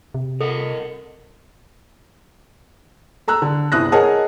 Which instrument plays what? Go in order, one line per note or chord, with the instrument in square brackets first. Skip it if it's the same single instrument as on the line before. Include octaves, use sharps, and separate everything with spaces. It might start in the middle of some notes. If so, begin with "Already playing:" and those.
[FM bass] C3
[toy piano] A4 [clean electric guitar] A#4 D#5 F#5
[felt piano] A4 A#5 E6 F#6
D3
G1 C2 D#6 F#6 A#6
G#4 A#4 C#5 D#5 F#5 A5